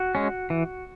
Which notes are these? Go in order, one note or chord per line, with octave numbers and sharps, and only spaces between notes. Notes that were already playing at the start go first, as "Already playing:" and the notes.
Already playing: F#4
G#3 C#4
E3